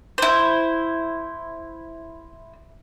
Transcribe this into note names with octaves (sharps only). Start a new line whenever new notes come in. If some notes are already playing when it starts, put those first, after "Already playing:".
E4 C5